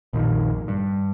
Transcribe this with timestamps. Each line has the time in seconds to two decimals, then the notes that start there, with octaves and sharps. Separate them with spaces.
0.13 A#1 F2 A#2 D#3
0.68 G2